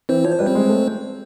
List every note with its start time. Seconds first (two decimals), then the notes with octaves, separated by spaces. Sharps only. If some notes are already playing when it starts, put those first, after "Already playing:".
0.09 E3 C4 C5
0.24 F3 C#5
0.31 C5
0.39 G3 B4
0.46 C4 C5
0.55 G#3
0.69 A3